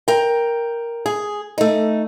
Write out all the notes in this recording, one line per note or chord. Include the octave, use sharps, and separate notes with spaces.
A#4 G5
G#4
A3 D#4